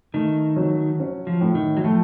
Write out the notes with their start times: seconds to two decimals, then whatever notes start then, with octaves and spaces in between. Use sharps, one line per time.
0.14 D#3 A3
0.56 F#3
0.99 C#4
1.27 F3
1.41 A2
1.55 D#3
1.77 F#3
1.84 F3 A3